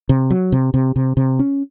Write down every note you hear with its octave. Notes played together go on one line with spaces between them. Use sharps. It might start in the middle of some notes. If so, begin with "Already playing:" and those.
C3
F#3
C3
C3
C3
C3
C#4